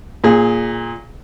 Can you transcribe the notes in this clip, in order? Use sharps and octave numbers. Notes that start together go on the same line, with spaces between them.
A#2 G#4